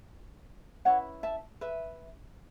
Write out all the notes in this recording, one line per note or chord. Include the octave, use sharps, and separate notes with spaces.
C#4 E4 B4 C#5 F#5
E5 A5
B4 E5